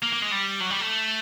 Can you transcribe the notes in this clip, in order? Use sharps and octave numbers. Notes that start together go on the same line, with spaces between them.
A#3
A#3
G#3
G3
F#3
G3
A3